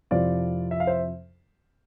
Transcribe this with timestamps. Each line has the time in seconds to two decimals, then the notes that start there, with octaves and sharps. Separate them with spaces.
0.11 F2 C3 F3 C4 E4 D5 F5
0.71 E5
0.80 F5
0.87 C5 E5